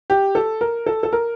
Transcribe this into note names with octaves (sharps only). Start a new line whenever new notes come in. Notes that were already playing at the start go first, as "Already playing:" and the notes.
G4
A4
A#4
A4
A4
A#4